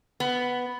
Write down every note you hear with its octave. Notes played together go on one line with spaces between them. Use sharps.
B3